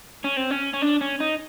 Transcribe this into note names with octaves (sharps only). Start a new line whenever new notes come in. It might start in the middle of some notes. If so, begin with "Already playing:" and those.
C#4
C4
C#4
C#4
D4
C#4
D#4